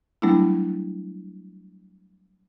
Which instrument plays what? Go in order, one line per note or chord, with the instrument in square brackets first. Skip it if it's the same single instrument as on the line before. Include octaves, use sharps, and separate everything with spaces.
[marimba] F#3 G3 A3 B3 D4 E4